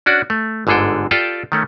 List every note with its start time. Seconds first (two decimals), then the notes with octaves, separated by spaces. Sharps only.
0.06 C#4 D4 F#4 D5
0.30 A3
0.67 G1 G#2 D3 G#4 A4 G5
1.11 F4 G4 A4 D5 G5 A5
1.52 D#3 A3 C#4